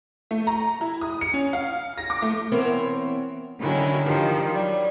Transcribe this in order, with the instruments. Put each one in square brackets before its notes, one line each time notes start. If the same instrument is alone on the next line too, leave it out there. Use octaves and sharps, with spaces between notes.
[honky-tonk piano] A3
A#5
E4
D#6
C#7
C#4
F5
A#6
D6
A3
[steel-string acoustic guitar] E3 B3 C4 A#4 C#5
[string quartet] D3 D#3 F#3 C#4 E4
D#3 F3 G3
F#3 G3